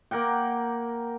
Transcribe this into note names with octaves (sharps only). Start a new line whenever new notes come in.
A#3 A#4 F#5 G5